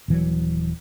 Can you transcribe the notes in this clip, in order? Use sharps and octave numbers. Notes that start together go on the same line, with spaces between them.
D#1 E3 F#3